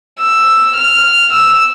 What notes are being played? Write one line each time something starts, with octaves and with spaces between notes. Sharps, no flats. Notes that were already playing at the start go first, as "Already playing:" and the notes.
E6
F6
E6